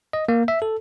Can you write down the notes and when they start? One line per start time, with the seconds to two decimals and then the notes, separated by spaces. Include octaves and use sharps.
0.13 D#5
0.29 A#3
0.48 E5
0.62 A4